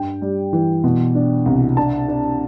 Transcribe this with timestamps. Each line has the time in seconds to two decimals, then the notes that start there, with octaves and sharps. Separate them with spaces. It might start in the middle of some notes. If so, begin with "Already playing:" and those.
Already playing: G2 G5
0.22 G3
0.53 E3
0.84 B2
1.15 D4
1.46 C2
1.77 D4 A5
2.08 D4